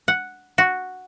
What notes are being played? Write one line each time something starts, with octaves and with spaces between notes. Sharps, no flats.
F#5
F#4